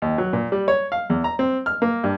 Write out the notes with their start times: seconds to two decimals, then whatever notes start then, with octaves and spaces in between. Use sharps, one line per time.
0.02 D#2
0.18 F#3
0.33 A#2
0.52 G3
0.68 C#5
0.92 F5
1.10 E2
1.24 A#5
1.39 C4
1.66 F6
1.82 A#3
2.04 G2